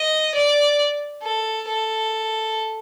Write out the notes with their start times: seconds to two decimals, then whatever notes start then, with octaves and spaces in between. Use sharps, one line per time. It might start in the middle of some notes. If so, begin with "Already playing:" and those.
Already playing: D#5
0.35 D5
1.23 A4
1.68 A4